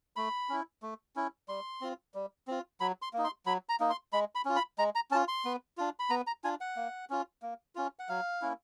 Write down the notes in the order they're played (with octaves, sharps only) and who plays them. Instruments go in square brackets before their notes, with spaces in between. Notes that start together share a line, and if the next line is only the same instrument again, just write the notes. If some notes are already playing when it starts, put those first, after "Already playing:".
[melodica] A3 B5
C#4 E4
A3
C#4 E4
G3 C6
C4 F4
G3
C4 F4
F#3 B5
C6
A#3 D#4
C6
F#3 B5
A#5
A#3 D#4
C6
G#3 B5
B5
C#4 F4
B5
G#3 A#5
A#5
C#4 A5
F4
C6
B3
D4 F4
B5
B3 A#5
A#5
D4 F4 G#5
F#5
A#3
C#4 F4
A#3
C#4 F4
F#5
F#3 F5
A#3 C#4 E4